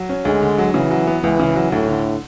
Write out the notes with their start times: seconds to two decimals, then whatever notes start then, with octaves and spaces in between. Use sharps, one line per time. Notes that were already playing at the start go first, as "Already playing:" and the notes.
Already playing: F#3
0.09 C#4
0.25 D2 G#3
0.42 D3
0.58 F#3
0.74 C#3 E3
0.91 F#3
1.07 B3
1.23 C#2 E3
1.40 C#3
1.56 F#3
1.72 D2 A2
1.89 D3